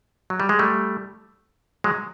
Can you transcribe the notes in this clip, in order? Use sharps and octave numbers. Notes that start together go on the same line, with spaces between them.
F#3
G3
G#3
G3 A3
F#3 G#3